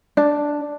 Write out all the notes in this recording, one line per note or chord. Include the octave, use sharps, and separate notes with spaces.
D4